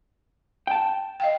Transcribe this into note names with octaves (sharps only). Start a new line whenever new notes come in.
G5 A5
D#5 F5 G5